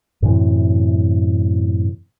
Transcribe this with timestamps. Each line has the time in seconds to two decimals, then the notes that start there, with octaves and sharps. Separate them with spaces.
0.22 F#2 A2 C3 E3